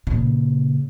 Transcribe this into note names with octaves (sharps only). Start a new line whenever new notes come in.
A#2 C#3